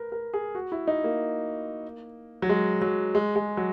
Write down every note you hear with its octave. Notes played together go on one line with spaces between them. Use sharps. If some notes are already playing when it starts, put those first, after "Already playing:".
Already playing: A#4 B4
A#4
G#4
F#4
E4
D#4
A#3
F#3
G#3
F#3
G#3
G#3
F#3